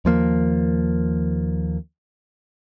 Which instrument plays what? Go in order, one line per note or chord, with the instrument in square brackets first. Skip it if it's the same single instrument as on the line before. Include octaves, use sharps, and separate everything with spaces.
[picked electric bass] D#2 F3 A#3